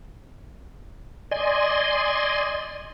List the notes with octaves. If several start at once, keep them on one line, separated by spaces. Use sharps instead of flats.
D5 D#5 G#5 C6